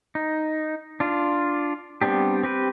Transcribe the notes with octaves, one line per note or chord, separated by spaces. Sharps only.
D#4
D4 F4
G3 B3 C4 D4 G4
C4 G4 B4